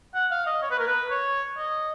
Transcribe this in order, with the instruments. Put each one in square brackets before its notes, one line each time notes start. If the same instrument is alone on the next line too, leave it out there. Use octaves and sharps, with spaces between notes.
[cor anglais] F#5
F5
D#5
C#5
B4
A#4
B4
C#5
D#5